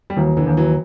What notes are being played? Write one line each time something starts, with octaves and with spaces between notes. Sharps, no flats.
G3
D#2 E3 F#3
D3 E3
D#2
E3 F#3